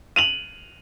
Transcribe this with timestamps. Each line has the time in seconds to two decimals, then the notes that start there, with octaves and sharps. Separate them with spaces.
0.16 D#7 F7 F#7